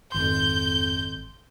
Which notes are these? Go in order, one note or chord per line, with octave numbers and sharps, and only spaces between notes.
G#1 F2 C6 G6